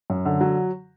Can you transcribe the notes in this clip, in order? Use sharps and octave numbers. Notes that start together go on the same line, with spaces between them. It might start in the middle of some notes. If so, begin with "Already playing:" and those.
F#2
D3
F#3